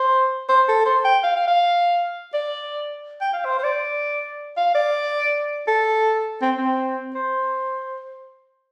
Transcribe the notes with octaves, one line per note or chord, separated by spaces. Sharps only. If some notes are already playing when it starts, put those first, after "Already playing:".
Already playing: C5
C5
A4
C5
G5
F5
F5
F5
D5
G5
F5
C5
C5
D5
F5
D5
A4
C4
C4
C5